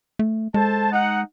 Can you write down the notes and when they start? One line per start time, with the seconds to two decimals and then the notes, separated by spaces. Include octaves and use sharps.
0.19 A3
0.54 G#3 A4 C5 A5
0.92 D#4 F#5